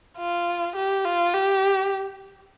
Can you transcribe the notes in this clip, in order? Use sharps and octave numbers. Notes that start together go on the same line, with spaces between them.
F4
G4
F4
G4